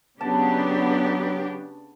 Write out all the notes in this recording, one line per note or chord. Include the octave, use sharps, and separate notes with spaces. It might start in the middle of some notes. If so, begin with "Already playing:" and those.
C#3 F#3 B3 D4 G4 A5